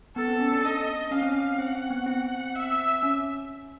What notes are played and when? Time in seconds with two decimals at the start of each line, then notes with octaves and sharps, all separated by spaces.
0.16 B3 A4
0.28 C4
0.40 C#4
0.52 D4
0.64 D#5
1.11 C#4 F5
1.22 C4
1.32 C#4
1.59 C4 F#5
1.75 C4
1.90 B3
2.06 C4 F#5
2.55 E5
3.03 C#4